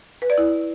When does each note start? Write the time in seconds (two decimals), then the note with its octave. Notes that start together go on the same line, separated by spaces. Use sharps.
0.22 B4
0.30 D5
0.38 E4